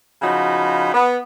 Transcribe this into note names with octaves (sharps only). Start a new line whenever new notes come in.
C#3 F3 D#4 F#4 B5
B3